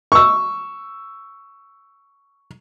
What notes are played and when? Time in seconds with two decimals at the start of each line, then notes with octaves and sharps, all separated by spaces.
0.12 C#6 E6